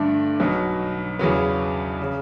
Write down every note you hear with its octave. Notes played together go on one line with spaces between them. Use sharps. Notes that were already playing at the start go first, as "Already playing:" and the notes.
Already playing: G2 D3 A3 D4
B1 B2 F#3
E2 C#3 F#3 B3
C#3